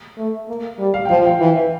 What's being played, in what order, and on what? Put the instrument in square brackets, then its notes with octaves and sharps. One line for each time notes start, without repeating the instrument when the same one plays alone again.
[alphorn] A3
A#3
G3
[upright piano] F5
G5
[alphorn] F3 [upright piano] F5
[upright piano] G5
[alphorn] E3